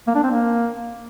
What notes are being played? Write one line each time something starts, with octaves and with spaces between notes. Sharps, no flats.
A#3
D4
C4
A#3